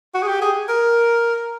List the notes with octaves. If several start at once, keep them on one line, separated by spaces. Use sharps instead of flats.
F#4
G#4
G4
G#4
A#4